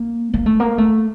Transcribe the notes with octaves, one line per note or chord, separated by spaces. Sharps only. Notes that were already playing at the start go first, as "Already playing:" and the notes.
Already playing: A#3
A#3
A3
A#3
A3